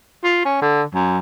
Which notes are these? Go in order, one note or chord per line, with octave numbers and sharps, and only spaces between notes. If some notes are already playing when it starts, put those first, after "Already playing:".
F4
C#4
D3
F#2